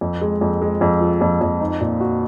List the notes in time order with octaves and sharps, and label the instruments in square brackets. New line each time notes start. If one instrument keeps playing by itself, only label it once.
[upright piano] F2
G#3
F2
G#3
F2
F3
F2
F2
D#4
A#2
F#4